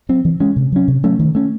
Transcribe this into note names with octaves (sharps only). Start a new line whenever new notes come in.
F#3 C4
E3
G#3 C#4
C3
F#3 C#4
C3
F#3 A3 C#4
D#3
A3 C#4